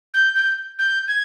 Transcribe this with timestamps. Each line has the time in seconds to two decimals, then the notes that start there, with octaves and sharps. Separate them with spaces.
0.14 G6
0.35 G6
0.78 G6
1.08 G#6